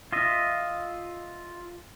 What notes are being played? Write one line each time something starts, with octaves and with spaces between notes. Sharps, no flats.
F4 D#5 E5